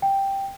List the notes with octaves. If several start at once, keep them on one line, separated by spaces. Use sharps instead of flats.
G5